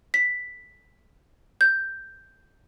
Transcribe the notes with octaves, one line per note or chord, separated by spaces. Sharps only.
B6
G6